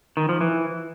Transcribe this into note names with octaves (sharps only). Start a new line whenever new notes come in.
D#3
F3
E3